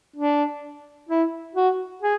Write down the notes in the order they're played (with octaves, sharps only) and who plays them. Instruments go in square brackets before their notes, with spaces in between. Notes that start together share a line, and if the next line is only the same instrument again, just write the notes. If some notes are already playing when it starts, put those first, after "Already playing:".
[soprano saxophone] D4
E4
F#4
G#4